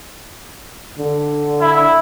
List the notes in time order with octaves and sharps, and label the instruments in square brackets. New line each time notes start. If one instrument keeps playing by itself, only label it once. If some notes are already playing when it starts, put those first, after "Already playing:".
[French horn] D3
[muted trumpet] E4